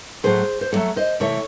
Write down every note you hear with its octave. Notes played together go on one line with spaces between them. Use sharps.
A2 F#3 A3 G#4 C5
C5
A2 F#3 A3 A4 C#5
C5 D#5
C3 E3 A3 A4 C#5